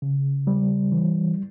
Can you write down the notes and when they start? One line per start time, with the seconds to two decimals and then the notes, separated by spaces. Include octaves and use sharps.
0.02 C#3
0.47 G3
0.92 E3